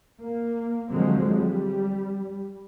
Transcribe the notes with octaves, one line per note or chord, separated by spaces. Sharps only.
A#3
D3 F3 F#3 G#3 C4
G3